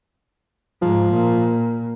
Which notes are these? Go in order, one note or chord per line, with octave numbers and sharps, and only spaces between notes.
G#2 F3
A#2